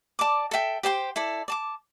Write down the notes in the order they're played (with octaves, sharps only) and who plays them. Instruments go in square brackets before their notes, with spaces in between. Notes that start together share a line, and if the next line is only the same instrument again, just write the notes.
[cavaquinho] D5 A5 D6
A4 E5 G5
G4 C5 G5 C6
E4 A4 D5
D5 A5 D6